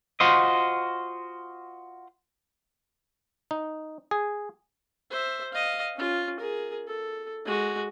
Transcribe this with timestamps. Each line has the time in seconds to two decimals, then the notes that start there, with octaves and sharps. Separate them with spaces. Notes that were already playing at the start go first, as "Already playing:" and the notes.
0.20 F4 F#4 C5 D#5
3.51 D#4
4.11 G#4
5.11 C5 E5
5.53 D#5 F5
5.96 C#4 F4
6.40 G#4 A#4
6.87 A4
7.45 G#3 F#4